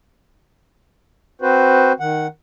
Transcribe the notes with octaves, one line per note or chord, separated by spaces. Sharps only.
C4 F#4 B4 C5
D#3 F#5